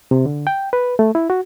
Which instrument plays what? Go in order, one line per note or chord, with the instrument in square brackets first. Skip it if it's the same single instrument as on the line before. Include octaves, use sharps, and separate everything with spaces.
[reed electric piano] C3
D3
G5
B4
A3
E4
F#4